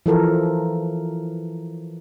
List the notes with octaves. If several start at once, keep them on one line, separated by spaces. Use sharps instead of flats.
E3 F3 A4 A#4